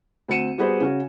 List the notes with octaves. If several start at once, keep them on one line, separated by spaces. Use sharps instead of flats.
D2 C4 F#5 C#7 D#7 E7
G3 B3 F#4 G#4 B4 C5
C#3 C#4 F#4